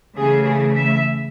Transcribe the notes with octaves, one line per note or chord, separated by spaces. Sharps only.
C#3 E3 A3 G#4
G#4
E5